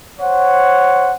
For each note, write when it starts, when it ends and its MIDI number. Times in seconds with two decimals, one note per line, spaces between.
0.20 1.14 72
0.20 1.14 73
0.20 1.14 78